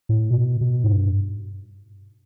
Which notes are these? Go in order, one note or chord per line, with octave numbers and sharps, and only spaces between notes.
A2
B2
B2
G#2
G2